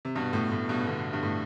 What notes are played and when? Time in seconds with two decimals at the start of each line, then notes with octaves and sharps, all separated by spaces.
0.05 C3
0.15 G2 B2
0.33 A2
0.51 A2
0.69 G2 B2
0.86 B2 D3
1.13 G2
1.23 A2